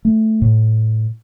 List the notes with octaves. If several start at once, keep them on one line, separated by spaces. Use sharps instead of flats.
A3
A2